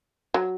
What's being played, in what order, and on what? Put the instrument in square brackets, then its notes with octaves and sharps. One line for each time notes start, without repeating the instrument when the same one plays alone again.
[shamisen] F#3